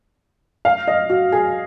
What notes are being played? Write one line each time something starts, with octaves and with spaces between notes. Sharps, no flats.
F5
D#5
F#4
G#4